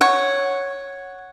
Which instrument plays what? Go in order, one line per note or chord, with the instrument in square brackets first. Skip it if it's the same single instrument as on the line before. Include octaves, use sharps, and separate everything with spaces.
[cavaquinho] C#5 F#5